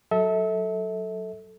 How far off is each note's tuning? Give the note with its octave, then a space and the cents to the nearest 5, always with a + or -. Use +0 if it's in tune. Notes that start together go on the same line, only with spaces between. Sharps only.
F#3 +0 A4 +0 E5 -35